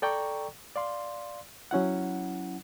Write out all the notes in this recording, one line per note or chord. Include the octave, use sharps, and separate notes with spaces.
A4 D5 G5 A#5 C#6
D5 F5 C6
F#3 C#4 E4 F#5